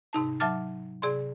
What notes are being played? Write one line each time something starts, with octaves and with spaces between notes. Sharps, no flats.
G#2 C3 D#4 A5
F#3 E5 A5 D6 F6 A6
C3 G#4 D5 C6